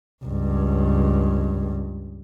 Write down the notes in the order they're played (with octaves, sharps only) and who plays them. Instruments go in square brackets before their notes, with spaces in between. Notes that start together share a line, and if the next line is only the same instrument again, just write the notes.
[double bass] C#2 G2